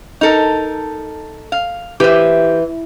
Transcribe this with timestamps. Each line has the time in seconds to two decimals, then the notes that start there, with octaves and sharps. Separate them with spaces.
0.21 D#4 A4 A#4
1.52 F5
2.00 E3 G4 C5